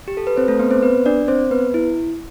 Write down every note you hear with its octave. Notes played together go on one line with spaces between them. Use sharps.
G4
A4
B4
C4 C5
A3 A4
B3 B4
C4 C5
B3 B4
D4 D5
C4 C5
B3 B4
E4